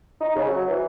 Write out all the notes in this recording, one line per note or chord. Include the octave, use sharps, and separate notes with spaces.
D#4
C#3
F#3
E3